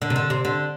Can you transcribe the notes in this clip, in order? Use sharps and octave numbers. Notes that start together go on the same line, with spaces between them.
D3
C3
D3
C3
D3